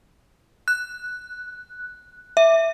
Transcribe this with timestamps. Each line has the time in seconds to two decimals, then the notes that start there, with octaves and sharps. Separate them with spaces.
0.68 F#6
2.37 E5